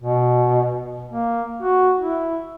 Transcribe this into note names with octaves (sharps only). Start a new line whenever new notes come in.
B2
A#3
F#4
E4